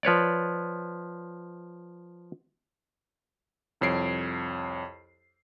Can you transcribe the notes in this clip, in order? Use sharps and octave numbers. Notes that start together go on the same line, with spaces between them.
F3 B4 C#5 D5
C2 F2 C#5 C7 D7